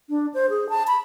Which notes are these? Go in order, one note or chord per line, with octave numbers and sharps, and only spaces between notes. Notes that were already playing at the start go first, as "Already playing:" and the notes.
D4
C5
G#4
A5
B5